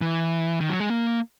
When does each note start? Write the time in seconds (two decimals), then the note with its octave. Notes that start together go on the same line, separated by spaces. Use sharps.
0.01 E3
0.61 D#3
0.69 F#3
0.80 G#3
0.90 A#3